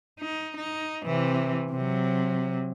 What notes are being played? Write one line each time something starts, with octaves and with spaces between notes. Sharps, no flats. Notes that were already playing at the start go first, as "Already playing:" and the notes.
D#4
D#4
C3 E3
C3 F#3